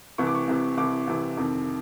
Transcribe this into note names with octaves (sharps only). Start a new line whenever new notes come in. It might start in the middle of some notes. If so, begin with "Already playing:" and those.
C2 C3 E3 C#6
D6
C#6
C2 C3 E3
C2 C3 E3 D6
C2 C3 E3
F2 C3 D#3 D6